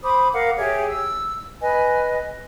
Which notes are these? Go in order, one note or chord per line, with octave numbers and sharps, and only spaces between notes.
C5 B5 D6 D#6
A#4 F5 F#5 D6
G4 G#4 C#5 E5
E6
B4 D#5 G#5